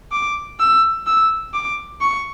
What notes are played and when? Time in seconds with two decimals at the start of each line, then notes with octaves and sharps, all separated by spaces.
0.12 D6
0.60 E6
1.07 E6
1.54 D6
2.01 C#6